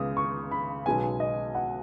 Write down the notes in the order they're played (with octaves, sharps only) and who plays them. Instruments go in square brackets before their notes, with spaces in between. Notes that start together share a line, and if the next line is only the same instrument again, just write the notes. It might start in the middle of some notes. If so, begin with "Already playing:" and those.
Already playing: [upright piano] C#2 C#3 B3 D#6
C#6
B5
B1 B2 G#3 B3 G#5
D#5
F#5